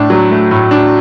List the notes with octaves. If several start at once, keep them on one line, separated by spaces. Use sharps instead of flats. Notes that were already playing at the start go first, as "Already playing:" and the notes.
Already playing: A2 D4
F#3
A3
A2
D4